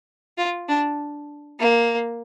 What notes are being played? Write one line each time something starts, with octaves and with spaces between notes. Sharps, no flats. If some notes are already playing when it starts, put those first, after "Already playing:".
F4
D4
A#3